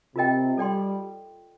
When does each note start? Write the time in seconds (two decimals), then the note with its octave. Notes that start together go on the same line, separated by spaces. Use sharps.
0.15 C3 F4 A#4 D#5 G5
0.57 G3 A4 D5 G5 C6